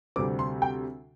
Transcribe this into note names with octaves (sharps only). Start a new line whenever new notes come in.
D2 C3 G3 C4 D6
C6
G5